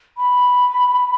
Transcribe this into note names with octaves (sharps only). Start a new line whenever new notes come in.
B5